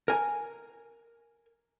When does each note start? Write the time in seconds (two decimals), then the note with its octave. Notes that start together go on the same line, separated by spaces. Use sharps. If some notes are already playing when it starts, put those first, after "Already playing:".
0.08 A#4 G#5